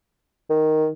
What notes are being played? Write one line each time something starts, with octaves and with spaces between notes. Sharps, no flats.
D#3